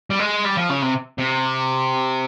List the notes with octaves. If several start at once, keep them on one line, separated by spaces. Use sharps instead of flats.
G3
G#3
G3
F3
C#3
C3
C3